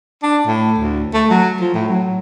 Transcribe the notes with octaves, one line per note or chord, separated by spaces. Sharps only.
D4
A2
D2
A3
F#3
F3
A2
F#3